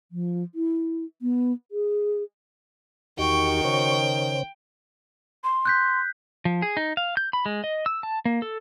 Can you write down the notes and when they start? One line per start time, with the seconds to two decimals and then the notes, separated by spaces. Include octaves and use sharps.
0.12 F3
0.55 E4
1.22 B3
1.72 G#4
3.19 E2 D#3 D#4 F#4 G4 G5 C#6
3.65 C#3 C5 C#5
5.44 C6
5.65 F#6 G6 B6
6.45 F3
6.62 G#4
6.77 D#4
6.97 F5
7.17 G6
7.33 B5
7.46 G#3
7.64 D#5
7.86 E6
8.03 A5
8.25 A#3
8.42 A4